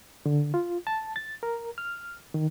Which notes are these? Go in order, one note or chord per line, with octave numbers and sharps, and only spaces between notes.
D3
F4
A5
A6
A#4
F6
D#3